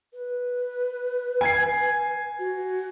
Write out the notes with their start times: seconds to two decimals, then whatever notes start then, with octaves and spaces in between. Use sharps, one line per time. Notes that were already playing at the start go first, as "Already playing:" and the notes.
0.13 B4
1.41 G#5 G#6 C7
2.39 F#4